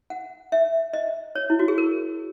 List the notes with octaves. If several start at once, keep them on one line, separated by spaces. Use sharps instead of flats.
F#5
E5
D#5
C#5
E4
F#4
G#4
A#4